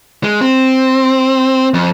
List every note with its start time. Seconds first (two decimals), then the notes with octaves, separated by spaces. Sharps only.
0.24 G#3
0.41 C4
1.74 F2